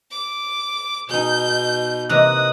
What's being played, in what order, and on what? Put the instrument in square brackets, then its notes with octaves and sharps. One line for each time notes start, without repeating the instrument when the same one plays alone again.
[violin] D6
[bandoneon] B2 [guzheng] D#4 G#4 [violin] G6
[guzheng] C3 E3 A#3 [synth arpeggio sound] D#5 F#6 [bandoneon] D#6